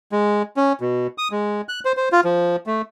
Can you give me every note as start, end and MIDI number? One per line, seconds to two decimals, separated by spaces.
0.12 0.43 56
0.57 0.73 61
0.81 1.07 47
1.18 1.28 87
1.31 1.61 56
1.69 1.80 90
1.85 1.92 72
1.97 2.09 72
2.12 2.21 65
2.25 2.56 53
2.66 2.82 57